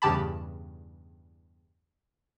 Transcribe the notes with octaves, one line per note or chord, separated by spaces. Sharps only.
E2 G2 C#3 G4 A5 B5